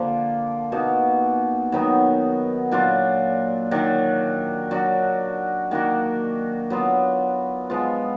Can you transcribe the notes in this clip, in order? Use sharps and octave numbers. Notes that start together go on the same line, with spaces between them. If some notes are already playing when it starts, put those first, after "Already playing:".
Already playing: D3 F3 A#3
B2 A#3 D#4 F#4
D#3 F#3 B3 D#4
A#2 F#3 D4 F4
D#3 F#3 D4
F#3 D4 F#4
D#3 A#3 D4 F#4
F#3 B3 F4
F3 G#3 B3 F4